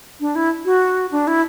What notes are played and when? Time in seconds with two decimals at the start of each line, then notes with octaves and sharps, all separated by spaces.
0.20 D4
0.35 E4
0.65 F#4
1.11 D4
1.27 E4